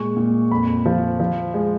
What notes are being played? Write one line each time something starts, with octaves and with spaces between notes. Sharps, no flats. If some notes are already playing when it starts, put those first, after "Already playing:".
Already playing: A#2 G#3 C#6
A#2
F2 B5
F3
F3
G#3